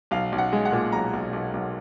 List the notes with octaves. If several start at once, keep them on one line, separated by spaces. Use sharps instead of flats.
B1 F5
B1
F#5
G#3
F#5
A#2
B1 A#5
B1
B1
B1